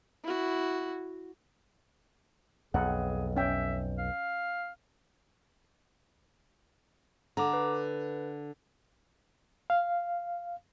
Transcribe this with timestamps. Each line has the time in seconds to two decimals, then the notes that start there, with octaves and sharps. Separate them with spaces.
0.24 E4 F#4
2.74 B1 F2 G#4 F#5
3.36 C#4 E5 G5
3.98 F5
7.37 D3 A#5 D6
7.53 B4
9.70 F5